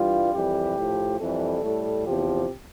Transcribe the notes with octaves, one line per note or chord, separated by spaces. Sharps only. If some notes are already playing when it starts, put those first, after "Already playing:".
Already playing: G2 E3 G3 F4
F2 E3 G3 G4
A2 F3
F2 E3 G3 A4
A2 G3
E2 C3 F3 G4